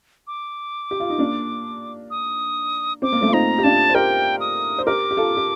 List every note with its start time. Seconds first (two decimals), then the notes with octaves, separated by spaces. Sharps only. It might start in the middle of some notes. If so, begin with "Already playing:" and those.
0.27 D6
0.91 G4
1.00 F4
1.10 D#4
1.18 A#3 D4
2.11 D#6
3.02 C4 D6
3.12 A#3
3.21 A3 C4
3.28 F4
3.33 C4 D#4 A#5
3.58 G4
3.64 D4 F4 A5
3.90 C5
3.95 G4 A#4 G5
4.40 D#6
4.78 C5
4.86 G4 A#4 D6
5.11 G4
5.17 F4 A4
5.37 G4